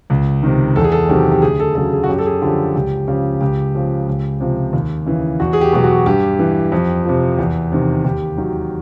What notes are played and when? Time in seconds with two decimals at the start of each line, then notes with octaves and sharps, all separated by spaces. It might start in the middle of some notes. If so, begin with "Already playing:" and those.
0.10 C#2
0.43 C3 D#3
0.76 E2 A4
0.84 G#4
0.92 A4
1.09 C3 D#3 F#3 G4
1.32 G4
1.42 D2 G#4
1.60 A4
1.75 C#3 F#3 A4
1.93 G#4
2.04 F#4
2.09 F#2 G4
2.18 A4
2.26 G#4
2.42 D3 F3 G4
2.75 C#2 G4
3.07 C#3 F3 G4
3.41 C#2 G4
3.75 C#3 F3
4.08 C#2
4.40 C3 F3
4.73 D#2
5.06 C#3 E3
5.40 E2 F#4
5.53 G#4
5.61 G4
5.72 B2 F#3 G4
5.84 F#4
6.06 G2 G4
6.39 E3
6.72 F2
7.05 C3 F3
7.39 E2
7.72 C3 D#3
8.05 D#2 G4
8.37 D#3 F#3